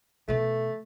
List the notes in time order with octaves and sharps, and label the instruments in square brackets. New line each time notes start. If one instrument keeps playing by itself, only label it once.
[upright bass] B2 E3 [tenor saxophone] A3